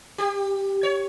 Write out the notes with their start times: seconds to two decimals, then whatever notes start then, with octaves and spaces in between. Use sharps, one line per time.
0.18 G4
0.83 C#5